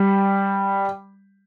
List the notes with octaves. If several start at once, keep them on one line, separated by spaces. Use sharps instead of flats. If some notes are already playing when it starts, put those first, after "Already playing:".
Already playing: G3